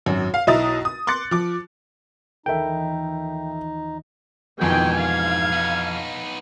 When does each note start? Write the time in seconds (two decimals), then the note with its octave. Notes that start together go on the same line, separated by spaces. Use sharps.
0.06 G#1 F#2
0.34 F5
0.47 B1 E4 D#5 A#5 D#6 A6
0.85 D#6
1.07 C6 D6 F#6 A6 C#7
1.31 F3 D6
2.46 D#2 E3 F3 D#4 A4 A#4 E5 G5
4.61 F2 G#2 B2 D#3 E3 G5 G#5
4.99 F5 G#6
5.52 B3 D#4